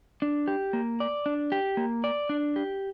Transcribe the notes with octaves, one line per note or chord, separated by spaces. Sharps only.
D4
G4
A#3
D5
D4
G4
A#3
D5
D4
G4